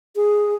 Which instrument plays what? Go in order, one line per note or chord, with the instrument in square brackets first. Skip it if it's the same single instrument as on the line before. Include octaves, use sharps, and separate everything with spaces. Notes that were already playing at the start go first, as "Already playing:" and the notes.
[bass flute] G#4